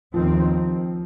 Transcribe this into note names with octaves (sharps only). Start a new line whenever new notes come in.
D#2 D#3 F3 C4